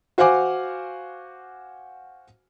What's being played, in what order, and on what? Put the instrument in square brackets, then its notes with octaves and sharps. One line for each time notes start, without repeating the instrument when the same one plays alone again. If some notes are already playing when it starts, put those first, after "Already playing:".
[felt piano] F#4 C5 F5 F#5 G#5 D6